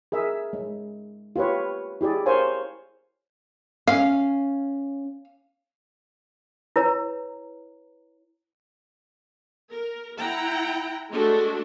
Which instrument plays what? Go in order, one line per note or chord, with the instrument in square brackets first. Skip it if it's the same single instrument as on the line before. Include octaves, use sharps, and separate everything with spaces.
[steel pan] G#4 A#4 E5
G#3
F4 G4 B4 C#5
E4 G4 G#4 D5
A#4 C5 C#5 F5 G#5
[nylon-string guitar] C#4 [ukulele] F5
[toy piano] E4 B4 C#5 A#5
[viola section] A#4
E4 F#5 G5 A#5
G#3 A3 D4 F#4 A4